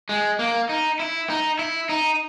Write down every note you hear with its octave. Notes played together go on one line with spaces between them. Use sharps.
G#3
A#3
D#4
E4
D#4
E4
D#4